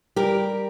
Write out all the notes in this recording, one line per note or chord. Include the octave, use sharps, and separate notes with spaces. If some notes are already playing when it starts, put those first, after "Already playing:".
G3 G4 A#4